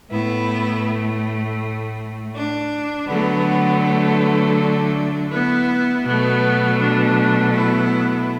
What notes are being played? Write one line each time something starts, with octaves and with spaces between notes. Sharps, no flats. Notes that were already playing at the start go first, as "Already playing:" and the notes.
A2 A3 B3 E4
D4
D3 F#3 A3 B3
B3
D4
B3 E4
B2 F#3 A3 B3
D4
B3 E4